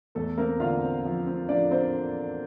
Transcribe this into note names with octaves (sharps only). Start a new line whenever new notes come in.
E2 A3 A4
A#3 C4 A#4
D3 F4 F5
C4
F3
C4
F3 D4 D5
C4 C5